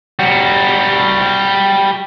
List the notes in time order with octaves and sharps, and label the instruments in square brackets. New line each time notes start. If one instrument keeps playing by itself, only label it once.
[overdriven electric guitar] G3 F#4